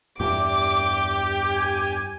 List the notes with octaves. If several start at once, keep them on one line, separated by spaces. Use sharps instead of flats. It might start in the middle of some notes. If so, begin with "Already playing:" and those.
E2 G2 G4 D6
G#5